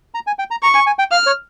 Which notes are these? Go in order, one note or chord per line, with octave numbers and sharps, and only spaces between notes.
A#5
G#5
G5
A#5
A#5 C#6
G#5
G#5
G5
F5 F6
C#5